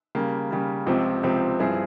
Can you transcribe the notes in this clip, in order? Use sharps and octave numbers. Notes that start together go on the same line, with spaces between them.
C#3 G3 A#3
C#3 G3 A#3
C#2 C3 F3 C4
C#2 C3 F3 C4
G2 F3 C4 E4 G#4